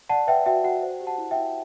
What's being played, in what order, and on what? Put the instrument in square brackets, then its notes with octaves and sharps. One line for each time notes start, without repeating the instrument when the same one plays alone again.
[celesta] D5 F#5 A5
B4 E5 G5
F#4 E5 G5
F#4 F#5
C5
G4
F#5 A5
E4
E5 G5
E4